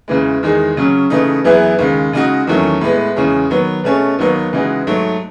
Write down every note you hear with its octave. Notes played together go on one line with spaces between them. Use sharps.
E2 C#3 E3 G#3
E2 D#3 G#3 D#4 G#4
C#3 F#3 C#4
C#3 E3 A3 D#4
F#2 E3 B3 E4 G#4
D#2 C#3 G#3
C#3 G#3 D#4 F#4
E2 D#3 F#3 A3 C#4
A2 G#3 B3
E2 C#3 G#3 C#4 G#4
D#3 F#3 B3
B2 A3 C#4 G#4
D#2 D#3 F#3 B3 D#4
C#3 E3 G#3 D#4 F#4
G#2 F#3 A3